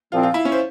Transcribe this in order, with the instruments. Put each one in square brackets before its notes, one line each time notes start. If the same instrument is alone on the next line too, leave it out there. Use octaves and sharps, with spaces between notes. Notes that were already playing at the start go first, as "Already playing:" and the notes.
[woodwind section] C2 A#2 F3 C4 [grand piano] F4
[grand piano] F4
E4
C#4
C5